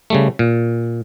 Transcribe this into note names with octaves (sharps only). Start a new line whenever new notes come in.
C#3 G3 A3
A#2